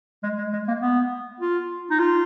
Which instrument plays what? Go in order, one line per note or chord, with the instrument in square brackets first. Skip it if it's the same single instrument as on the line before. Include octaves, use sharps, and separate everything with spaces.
[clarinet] G#3
G#3
G#3
A#3
B3
F4
D#4
F4